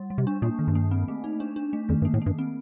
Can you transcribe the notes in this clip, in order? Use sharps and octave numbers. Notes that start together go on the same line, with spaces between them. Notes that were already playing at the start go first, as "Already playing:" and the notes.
Already playing: G3
G3
C3
D4
A#2 A#3
D#3
G2
A#3
C4
A3
D#4
D4
D4
A3
F2 D#3
G2
A#3
A2
G2 A#3
C4